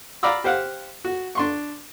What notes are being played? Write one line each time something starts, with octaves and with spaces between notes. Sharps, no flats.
D5 F5 A#5 B5 D6 E6
G4 C5 F5 F#5
F#4
D4 C6 C#6